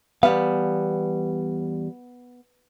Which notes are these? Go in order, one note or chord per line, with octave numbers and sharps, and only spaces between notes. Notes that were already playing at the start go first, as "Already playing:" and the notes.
E2 G3 B3 F5